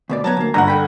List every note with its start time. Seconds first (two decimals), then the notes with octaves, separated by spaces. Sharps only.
0.09 D2 B2 D5
0.24 F#3 B3 A5 A#5 G#6
0.37 D2 A#3
0.54 G1 D3 F#5 A#5
0.68 A4 G5 B5